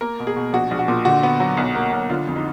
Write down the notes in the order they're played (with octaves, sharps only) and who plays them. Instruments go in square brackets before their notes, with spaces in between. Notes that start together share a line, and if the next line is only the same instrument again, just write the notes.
[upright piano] A#3 A#4
B2
G#4
B2
A#1 F#4
A#1
F#4
A#2
D3 F#4
B3
F#3
B1
A#3
B1
D3 F4
F2
D#4